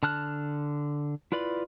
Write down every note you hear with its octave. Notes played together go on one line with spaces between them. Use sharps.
D3 A5 F6 F#6
E4 F4 B4 D5 B5